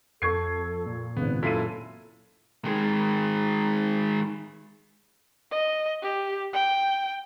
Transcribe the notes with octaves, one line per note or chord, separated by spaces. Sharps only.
F2 A4 C#6 G#6 C7
A#2
G#1 C#2 B3 B4
F#2 E4 F4 A4 B6 C7 D#7
D#3 G#3
D#5
G4
G5